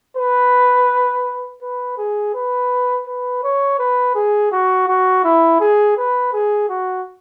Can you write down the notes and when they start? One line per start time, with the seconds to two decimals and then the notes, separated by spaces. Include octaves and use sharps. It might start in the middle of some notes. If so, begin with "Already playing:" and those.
0.17 B4
1.62 B4
1.98 G#4
2.34 B4
3.06 B4
3.43 C#5
3.79 B4
4.15 G#4
4.52 F#4
4.88 F#4
5.24 E4
5.60 G#4
5.97 B4
6.33 G#4
6.69 F#4